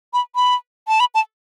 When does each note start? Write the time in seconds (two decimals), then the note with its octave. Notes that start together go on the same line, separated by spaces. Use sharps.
0.13 B5
0.35 B5
0.88 A5
1.00 B5
1.15 A5